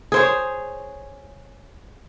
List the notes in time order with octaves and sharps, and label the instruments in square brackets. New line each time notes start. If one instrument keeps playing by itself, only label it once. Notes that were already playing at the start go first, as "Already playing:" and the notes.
[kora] G#4 C5 C#5